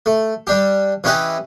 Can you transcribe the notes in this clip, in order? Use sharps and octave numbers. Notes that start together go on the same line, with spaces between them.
A3
G3 D4 G4
E3 C#4 E4 G4 B4 D#5